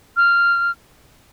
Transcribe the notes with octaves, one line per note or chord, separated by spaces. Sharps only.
F6